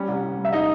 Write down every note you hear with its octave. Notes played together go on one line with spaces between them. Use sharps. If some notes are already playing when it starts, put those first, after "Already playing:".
Already playing: G3 C#4
C2
C2
G3
E5
D#4 D#5